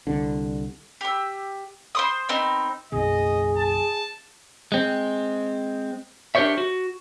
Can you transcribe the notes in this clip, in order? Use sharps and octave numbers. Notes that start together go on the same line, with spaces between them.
C2 D3
G4 E6
C5 C6 D#6
B3 C4 D#4
F#1 B1 G#4 D#5
A5
G#3 C4
D4 G4 A#4 C5 C#5 E5
F#4